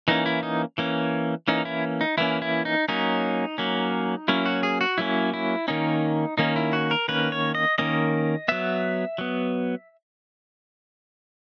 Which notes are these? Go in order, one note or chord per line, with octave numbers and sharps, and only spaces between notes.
E3 A#3 C#4 D#4
E4
D#4
E3 A#3 C#4
E3 A#3 C#4 D#4
E4
D#4
E3 A#3 C#4 E4
E4
D#4
F#3 A#3 C#4 D#4
F#3 A#3 C#4
F#3 A#3 C#4 E4
F#4
G#4
F#4
F#3 A#3 C#4 E4
E4
D#3 A#3 C#4 D#4
D#3 A#3 C#4 D#4
E4
F#4
A#4
D#3 A#3 C#4 B4
C#5
D#5
D#3 A#3 C#4 D#5
F#3 B3 E5
F#3 B3